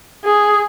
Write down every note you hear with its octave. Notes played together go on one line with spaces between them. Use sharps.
G#4